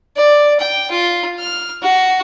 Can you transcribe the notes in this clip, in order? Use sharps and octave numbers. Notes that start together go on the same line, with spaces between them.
D5
G5
F4
F6
F#4